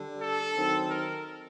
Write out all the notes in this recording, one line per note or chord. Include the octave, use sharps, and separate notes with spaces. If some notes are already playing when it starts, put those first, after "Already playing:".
Already playing: D3 G3 D4
A4
D#3 F#3 C4
A#4